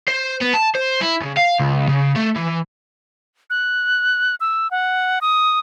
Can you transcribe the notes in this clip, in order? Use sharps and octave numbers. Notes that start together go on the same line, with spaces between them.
C5
B3
A5
C5
E4
C#3
F5
C#2
C#3
A3
E3
F#6
E6
F#5
D#6